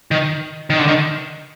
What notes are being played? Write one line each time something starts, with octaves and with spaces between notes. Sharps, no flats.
D#3
D#3
D3
D#3